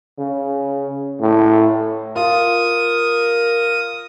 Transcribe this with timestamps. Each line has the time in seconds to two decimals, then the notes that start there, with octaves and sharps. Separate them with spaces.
0.18 C#3
1.21 A2
2.16 F4 A#4 D#6